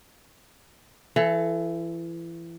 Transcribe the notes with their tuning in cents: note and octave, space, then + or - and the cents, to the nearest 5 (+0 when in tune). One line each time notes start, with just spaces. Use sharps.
E3 +30 A4 +0